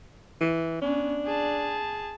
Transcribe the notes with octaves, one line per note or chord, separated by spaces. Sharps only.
E3
B3 C#4 D4
G#4 A5